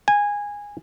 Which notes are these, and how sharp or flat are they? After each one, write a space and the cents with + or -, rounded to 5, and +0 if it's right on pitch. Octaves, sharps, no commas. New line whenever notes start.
G#5 -15